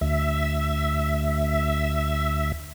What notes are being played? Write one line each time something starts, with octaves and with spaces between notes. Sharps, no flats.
D2 E5